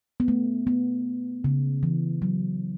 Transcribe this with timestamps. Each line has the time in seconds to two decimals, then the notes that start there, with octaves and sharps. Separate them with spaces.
0.20 B3
0.28 A3
0.67 B3
1.44 C#3
1.83 E3
2.22 F#3